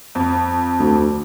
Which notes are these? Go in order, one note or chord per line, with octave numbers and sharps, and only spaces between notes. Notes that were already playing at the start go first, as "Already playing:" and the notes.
F2
D2